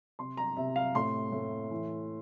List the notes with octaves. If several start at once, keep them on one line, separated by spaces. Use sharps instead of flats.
C3 C6
A#5
C3 E5
F5
A2 C6
A2
E3